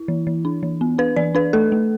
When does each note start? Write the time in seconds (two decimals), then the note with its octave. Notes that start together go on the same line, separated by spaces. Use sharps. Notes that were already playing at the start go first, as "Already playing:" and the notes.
Already playing: E4
0.08 E3
0.27 E3
0.45 D4
0.63 E3
0.81 B3
0.98 D4 B4
1.16 E3 D5
1.35 D4 B4
1.53 A3 A4
1.72 A3